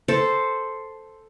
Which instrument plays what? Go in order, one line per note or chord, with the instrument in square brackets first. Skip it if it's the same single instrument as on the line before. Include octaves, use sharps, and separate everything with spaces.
[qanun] A4 C5 A5